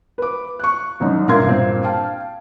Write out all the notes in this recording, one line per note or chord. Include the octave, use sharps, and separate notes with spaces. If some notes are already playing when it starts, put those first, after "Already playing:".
B4 D6
C#6 F#6
C2 F#2 D#4
G2 A#2 A#4 E5 C6 G#6
G2 A#2 C4
F5 G5 A5